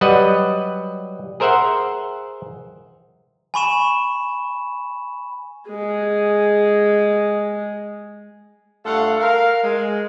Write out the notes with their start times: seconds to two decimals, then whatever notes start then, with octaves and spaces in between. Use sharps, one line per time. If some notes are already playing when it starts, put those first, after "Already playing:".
0.01 F#3 G3 B4 D#5 F#5
1.40 G#4 A#4 C5 E5 F#5
3.54 G#5 B5 C#6 E7
5.68 G#3 G#4
8.86 G2 A3 F4 A4 F5 F#5
9.20 A#4 F5
9.64 G#3